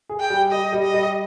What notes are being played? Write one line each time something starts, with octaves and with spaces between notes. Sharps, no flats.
G#4
G5
G3
G3 D#5
G3
D#5
G3